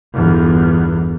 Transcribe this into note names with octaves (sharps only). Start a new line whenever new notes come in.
G1 E2